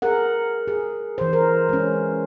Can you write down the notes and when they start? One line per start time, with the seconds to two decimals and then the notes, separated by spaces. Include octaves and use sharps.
0.02 G#4 A#4 F#5
0.68 G#4
1.18 E3 C5
1.33 A#4
1.69 G#3 C#4